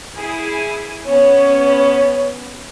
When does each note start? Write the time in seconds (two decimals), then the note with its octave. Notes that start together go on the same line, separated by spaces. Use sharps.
0.15 E4 G#4 G#5
1.05 B3 C#4 C#5